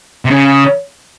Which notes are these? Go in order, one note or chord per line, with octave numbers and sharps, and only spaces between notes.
C3
C#3